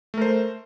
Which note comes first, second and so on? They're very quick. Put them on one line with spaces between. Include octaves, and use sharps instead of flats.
A3 A#4 C5